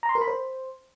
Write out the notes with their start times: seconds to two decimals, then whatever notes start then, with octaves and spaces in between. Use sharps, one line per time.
0.03 A#5
0.09 C6
0.15 A#4
0.21 B5
0.28 C5